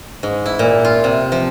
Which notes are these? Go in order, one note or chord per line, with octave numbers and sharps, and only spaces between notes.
G#2
E4
A#2
F4
C3
F3